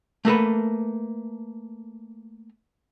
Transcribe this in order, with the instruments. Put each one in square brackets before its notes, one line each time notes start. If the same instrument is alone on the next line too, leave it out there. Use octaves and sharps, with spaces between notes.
[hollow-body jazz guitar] A3 A#3 A4 B4